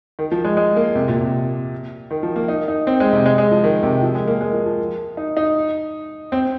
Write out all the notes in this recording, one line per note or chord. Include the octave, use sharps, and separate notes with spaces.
D#3
F3
G#3
G#3
A#3
C3
A#2
C3
D#3
F3
A#3
D#4
D#4
C4
G#3
C3
G#3
G#3
F3
D#3
C3
F3
G#3
A#3
G#3
F3
F3
D#4
D#4
C4